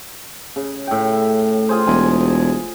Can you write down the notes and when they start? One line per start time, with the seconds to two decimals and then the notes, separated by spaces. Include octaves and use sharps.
0.56 C#3
0.87 A2 G5
1.69 F4 G#4 C5
1.87 E1 G#5